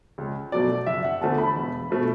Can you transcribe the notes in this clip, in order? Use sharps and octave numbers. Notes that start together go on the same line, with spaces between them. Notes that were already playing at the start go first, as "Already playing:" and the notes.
C#2
B2 F#3 A3 D5
F#1 E5
F#5
E2 D3 A3 A5
B5
E1
B2 A3